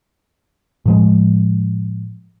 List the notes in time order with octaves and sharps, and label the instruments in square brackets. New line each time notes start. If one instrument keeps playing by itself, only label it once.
[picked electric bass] A2 F3 G#3